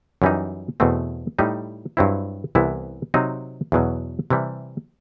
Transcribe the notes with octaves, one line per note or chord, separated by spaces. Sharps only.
F#2 E3 G3 D#4
E2 B2 A3 C4
A2 G3 D#4
G2 F#3 C4 E4
C2 C3 E3 B3 E4
C3 F#3 C4 D#4
E2 B2 F#3
C3 E3 G3